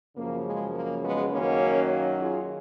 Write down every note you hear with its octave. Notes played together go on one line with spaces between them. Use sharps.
F#2 C#3 F3 A#3
G#3
A#3
G#3 B3
F#2 D#3 F#3 A#3 C#4
F4 G#4